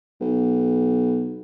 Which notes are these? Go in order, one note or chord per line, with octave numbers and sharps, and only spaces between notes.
B1